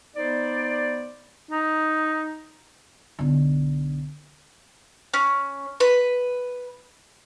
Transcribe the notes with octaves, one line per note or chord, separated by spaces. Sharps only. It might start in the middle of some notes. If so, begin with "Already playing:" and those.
B3 D#4 C5 D5
D#4
B1 D3
C#4
B4